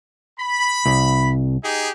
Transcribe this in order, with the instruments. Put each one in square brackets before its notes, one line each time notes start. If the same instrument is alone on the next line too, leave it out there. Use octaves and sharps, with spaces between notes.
[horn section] B5
[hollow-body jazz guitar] C2
[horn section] D#4 G4 G#4